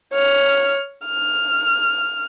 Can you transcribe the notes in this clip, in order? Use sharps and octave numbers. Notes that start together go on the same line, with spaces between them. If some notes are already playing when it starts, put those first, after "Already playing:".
C#5 F6
F6